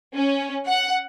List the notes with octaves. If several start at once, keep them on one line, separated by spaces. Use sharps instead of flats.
C#4
F#5